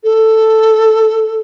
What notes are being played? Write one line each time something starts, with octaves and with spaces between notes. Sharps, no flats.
A4